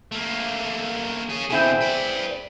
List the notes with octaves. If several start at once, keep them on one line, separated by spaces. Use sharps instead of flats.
A3 A#3
C#4 G#4
B2 D3 C4 E4 G#4
B4 D5